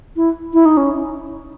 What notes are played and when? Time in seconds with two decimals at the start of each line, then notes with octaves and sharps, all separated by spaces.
0.16 E4
0.54 E4
0.66 D#4
0.77 C#4